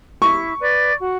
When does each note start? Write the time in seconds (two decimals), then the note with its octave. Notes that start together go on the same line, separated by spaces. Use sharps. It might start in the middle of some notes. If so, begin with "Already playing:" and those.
0.22 E4 C#6
0.60 B4 D5
0.99 F#4